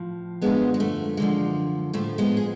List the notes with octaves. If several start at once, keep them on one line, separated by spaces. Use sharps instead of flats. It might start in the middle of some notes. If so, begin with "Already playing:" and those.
Already playing: A2 F3
F#2 D3 F3 G#3 B3
G#3
A3
F#2 D3 F3 G#3
A2 F3 A3
G#3 B3
G#4